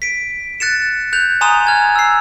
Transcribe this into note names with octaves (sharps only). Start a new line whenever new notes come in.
B6 D7
F#6 A6 C#7 E7
F#6 G6 F7
G#5 A#5 C6 D#6 E7
F6 G#6
E6 C7